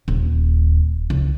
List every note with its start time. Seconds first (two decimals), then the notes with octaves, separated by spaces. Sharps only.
0.08 D#1
1.10 C#2